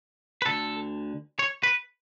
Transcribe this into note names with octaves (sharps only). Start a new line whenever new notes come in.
B4
D2 D3 A4
C#5
B4